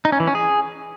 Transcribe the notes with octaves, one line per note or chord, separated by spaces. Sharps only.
D#4
C#4
E3
C#4
G#4